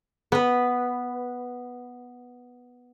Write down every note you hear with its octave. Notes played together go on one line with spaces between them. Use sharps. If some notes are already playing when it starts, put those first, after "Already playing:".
B3 B4